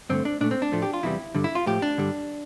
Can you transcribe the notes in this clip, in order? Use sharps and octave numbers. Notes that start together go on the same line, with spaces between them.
G2 D3 A3 C4
D4
A#2 A3 D4
C4
D4
A2 F3 A3
G4
F4
E2 C3 E3 G3 E4
G2 D3 G3
E4
F4
A2 F3 A3 G4
D4
G2 D3 G3